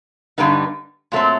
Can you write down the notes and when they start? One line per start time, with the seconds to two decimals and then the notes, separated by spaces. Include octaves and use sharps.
0.38 G2 D3 G3 B3 D#4
1.12 A#2 F#3 A3 C4